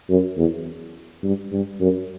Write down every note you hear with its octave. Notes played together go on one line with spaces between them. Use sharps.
F#2
E2
G2
G2
F#2